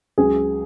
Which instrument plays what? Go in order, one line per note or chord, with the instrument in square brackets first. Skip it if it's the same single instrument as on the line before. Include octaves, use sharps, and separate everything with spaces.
[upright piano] C#2 C#3 F#3 G#4